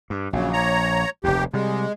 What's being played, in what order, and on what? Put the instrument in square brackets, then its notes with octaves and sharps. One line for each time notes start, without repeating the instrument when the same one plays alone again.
[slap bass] G2
[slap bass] A#1 [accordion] C#3 F#3
[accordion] C#5 A#5
[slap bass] F1 D#2 [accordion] G4
[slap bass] C3 G3 [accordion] G#3